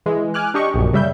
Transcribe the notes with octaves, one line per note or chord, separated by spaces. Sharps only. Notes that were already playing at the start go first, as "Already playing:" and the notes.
E3 G#3
G#5 D6 F6 F#6
D4 G4 D#5 C#6
A#1 F#2
C#3 G3 E5 G6